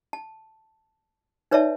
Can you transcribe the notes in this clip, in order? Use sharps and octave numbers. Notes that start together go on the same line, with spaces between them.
A5
D#4 B4 C#5 D5 E5 A5